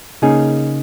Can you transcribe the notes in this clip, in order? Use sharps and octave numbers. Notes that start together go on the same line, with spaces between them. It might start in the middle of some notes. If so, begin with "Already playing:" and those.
C#3 A#3 C#4 D#4 G#4